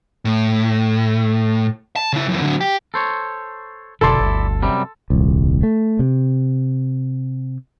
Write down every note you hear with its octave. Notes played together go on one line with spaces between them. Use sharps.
A2
A5
C#3 E4
F#2 E3
D3 F#3
G4
A4 C5 C#5
F1 B2 D3 E4 A4 D5 C6
G1 D2
F#2 C3 G3
D#1 C2
A3
C3